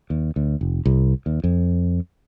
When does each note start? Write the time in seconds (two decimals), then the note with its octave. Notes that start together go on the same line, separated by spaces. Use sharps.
0.10 D#2
0.36 D2
0.61 F1
0.85 C2
1.26 D#2
1.44 F2